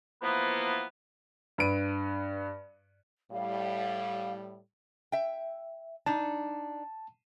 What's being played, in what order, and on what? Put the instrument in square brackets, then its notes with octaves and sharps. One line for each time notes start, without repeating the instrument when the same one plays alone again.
[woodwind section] E3 F3 A#3 B3
[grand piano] G2 B4 D7 D#7
[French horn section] A2 G3 [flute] F5
[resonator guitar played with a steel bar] E5 G5
[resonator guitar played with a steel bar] D4 D#4 [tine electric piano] A5